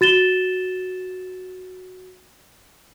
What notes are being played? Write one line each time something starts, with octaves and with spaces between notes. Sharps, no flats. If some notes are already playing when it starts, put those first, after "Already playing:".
F#4 A6 E7 G7